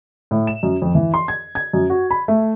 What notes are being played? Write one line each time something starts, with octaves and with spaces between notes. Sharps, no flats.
A2
E7
F#2
F2
E3
C6
G#6
G#6
F#2
F#4
B5
A3